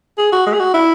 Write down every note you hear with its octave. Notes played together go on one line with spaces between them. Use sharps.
G#4
F#4
G#3
G#4
F#4
E4